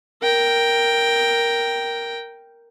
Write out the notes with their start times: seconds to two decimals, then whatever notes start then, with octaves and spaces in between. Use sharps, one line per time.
0.22 A#4 G5